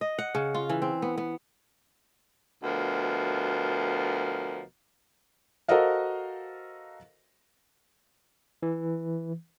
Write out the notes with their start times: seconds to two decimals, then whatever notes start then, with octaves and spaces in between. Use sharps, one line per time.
0.01 D#5
0.19 F#5
0.35 C#3
0.54 F4
0.69 E3
0.82 C4
1.02 B3
1.18 B3
2.64 D2 B2 F3 A#4
5.68 F#4 A4 A#4 C5 D#5 F5
8.63 E3